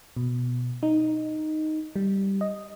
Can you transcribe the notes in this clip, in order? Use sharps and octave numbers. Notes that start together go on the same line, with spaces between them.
B2
D#4
G3
D#5